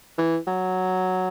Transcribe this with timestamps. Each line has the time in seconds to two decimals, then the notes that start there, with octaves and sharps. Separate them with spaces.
0.18 E3
0.47 F#3